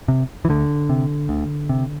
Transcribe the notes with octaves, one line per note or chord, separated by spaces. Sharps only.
C3
E3
D2 D3
C3
D2
C3